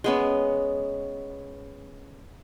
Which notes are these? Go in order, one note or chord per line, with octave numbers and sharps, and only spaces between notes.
G#3 B3 C#4